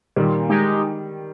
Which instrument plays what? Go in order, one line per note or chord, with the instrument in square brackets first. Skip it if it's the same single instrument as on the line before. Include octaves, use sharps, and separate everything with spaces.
[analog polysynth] A#2 [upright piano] D#3 G3
[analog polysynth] G#3 D#4 G4